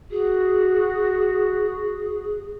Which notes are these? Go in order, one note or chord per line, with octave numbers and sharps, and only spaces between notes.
F#4 G#4